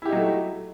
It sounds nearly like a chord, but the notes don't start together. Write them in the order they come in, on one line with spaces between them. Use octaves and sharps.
E4 G4 D#4 F#3 A3